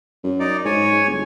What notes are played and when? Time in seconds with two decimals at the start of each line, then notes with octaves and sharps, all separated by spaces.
0.24 F#2
0.40 D#4 D5
0.65 G#2 C#5 G#5
1.07 G1